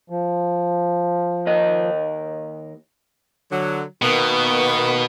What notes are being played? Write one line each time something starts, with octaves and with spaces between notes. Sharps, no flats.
F3
D#2 A#4 D#5
D3 F#3
B2 D#3 A#3 B3